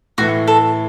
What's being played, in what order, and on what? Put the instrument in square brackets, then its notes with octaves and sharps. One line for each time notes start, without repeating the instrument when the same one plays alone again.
[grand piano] A2 E3 A3 [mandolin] F#4
[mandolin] A4